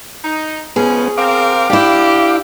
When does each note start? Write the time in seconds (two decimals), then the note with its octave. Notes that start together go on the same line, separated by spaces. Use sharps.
0.24 D#4
0.76 F3 G#3 B3 C#4 G#4
1.18 C4 A#4 F5 D6
1.70 D4 E4 G4